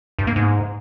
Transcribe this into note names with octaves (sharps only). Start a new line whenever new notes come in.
G2
A#3
G#2